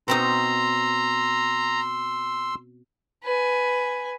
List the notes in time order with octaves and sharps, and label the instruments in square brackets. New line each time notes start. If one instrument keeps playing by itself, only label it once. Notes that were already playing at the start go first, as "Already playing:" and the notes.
[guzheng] B2 C4 D#4 [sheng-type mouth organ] A#5 [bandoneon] C6 E6
[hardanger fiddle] B4 G#5